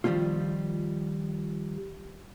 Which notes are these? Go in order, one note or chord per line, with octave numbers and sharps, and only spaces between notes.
D#3 F3 G3 A3 A#3 F4